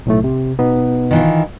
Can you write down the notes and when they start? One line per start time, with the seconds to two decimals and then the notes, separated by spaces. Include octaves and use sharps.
0.06 B1 A2 A3
0.24 C3
0.59 B2 B3 D#4
1.11 D#3 E3 F4